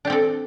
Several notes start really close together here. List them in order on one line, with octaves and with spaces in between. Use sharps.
D4 G4 C4 A4